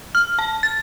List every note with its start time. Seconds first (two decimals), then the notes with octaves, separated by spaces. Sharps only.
0.15 F6
0.39 A5
0.63 A6